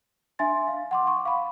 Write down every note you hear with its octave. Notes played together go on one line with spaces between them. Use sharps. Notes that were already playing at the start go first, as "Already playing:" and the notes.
D4 E5 G#5 C6 A6
F5
F#5 C6 D6
C#6
F5 B5